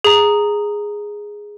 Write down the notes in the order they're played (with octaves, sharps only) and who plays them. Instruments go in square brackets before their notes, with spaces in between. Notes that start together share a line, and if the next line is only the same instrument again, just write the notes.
[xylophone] G#4 A#5